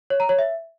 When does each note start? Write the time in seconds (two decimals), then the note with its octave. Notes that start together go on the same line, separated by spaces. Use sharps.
0.10 C#5
0.20 A#5
0.29 C#5
0.39 E5